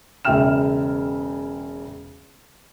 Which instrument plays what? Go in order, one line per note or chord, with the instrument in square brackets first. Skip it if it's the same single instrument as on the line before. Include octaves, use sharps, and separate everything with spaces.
[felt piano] E1 C#3 E5 G5 F6 E7